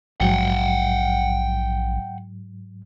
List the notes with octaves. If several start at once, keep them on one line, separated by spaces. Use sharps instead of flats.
A#1 G#2 F#3 F#5 G5